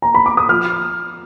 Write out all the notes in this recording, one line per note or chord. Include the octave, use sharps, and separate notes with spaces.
A#5
B5
D6
D#6
F3 F6